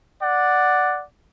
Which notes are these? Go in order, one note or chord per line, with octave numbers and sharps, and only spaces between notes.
D5 F#5